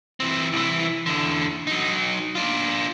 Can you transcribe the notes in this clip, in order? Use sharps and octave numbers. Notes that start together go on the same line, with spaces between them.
E3 C4
C2 E3
E2 D3
F#3 D#4
D4 F4